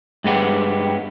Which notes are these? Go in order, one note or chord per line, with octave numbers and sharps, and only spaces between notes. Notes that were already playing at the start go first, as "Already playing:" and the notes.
G2 G#3 B3 G4